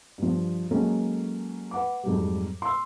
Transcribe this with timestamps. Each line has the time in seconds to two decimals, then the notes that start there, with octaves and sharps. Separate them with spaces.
0.18 G2 F3
0.71 F#3 G#3 A#3 C#4 A4
1.71 B4 F#5 D6
2.03 F2 G#2 F#3 G3
2.62 C6 E6